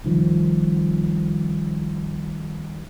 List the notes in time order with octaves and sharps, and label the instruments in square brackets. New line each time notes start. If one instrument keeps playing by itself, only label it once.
[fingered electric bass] C2 D#3 F3